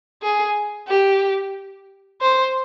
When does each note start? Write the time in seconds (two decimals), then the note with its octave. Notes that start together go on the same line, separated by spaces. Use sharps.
0.22 G#4
0.88 G4
2.22 C5